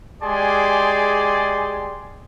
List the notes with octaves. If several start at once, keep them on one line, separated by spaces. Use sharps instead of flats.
G#3 G4 G#4 D5 G#5 C6